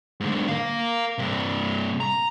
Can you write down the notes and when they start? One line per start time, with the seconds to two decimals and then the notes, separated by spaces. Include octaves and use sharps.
0.20 G#2 D3
0.48 A#4 F5
1.18 G2 C3
2.00 A#5